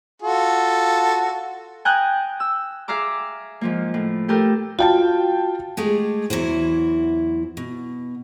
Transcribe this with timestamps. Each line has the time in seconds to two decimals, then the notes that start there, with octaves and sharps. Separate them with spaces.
0.22 F4 F#4 A4
1.85 G5 G#5 A#5 D#6 F#6 G6
2.40 E6
2.88 G#4 E5 F5 A#5 D6
3.61 G#2 F3 A#3
3.94 A2
4.28 A3 G4 A4 A#4 G6
4.79 F4 F#4 G5 A5
5.77 G#3 A3 G4 G#4
6.30 E2 E3 F#3 E4 C5
7.57 B2